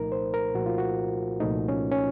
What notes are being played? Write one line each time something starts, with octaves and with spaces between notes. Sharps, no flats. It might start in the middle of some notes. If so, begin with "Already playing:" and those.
Already playing: C2 A#2 F3 A3 D#4 A#4
C5
A#4
C2 A#2 F3 A3 F#4
F4
F#4
C2 A#2 F3 A3 D#4
C#4
C#4